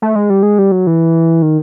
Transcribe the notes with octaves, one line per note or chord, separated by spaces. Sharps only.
A3
G#3
G3
G#3
G3
F#3
E3
D#3